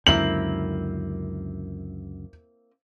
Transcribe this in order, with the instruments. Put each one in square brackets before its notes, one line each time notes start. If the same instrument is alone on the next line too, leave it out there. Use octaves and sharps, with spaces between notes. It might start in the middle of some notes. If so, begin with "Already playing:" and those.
[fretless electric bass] C#2 F#2 D3 [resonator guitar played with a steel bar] A#3 C4 E4 [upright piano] F#7